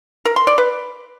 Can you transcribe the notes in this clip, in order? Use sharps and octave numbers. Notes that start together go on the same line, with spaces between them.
A#4
C6
D5
B4